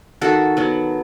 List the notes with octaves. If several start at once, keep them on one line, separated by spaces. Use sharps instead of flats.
D#3 F#4 A4
F#3 B3